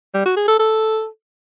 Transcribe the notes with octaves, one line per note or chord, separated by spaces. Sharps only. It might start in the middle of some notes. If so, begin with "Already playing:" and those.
G3
F#4
G#4
A4
A4